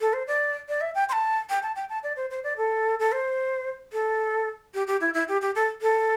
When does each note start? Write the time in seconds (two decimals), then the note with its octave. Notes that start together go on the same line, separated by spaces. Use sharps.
0.01 A4
0.13 C5
0.27 D5
0.69 D5
0.81 E5
0.95 G5
1.09 C6
1.13 A5
1.50 G5
1.63 A5
1.76 G5
1.89 A5
2.03 D5
2.16 C5
2.30 C5
2.44 D5
2.57 A4
3.00 A4
3.12 C5
3.93 A4
4.74 G4
4.87 G4
5.01 E4
5.14 E4
5.28 G4
5.42 G4
5.55 A4
5.82 A4